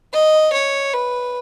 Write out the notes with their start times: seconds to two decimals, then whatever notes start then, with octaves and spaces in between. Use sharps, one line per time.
0.13 D#5
0.53 C#5
0.94 B4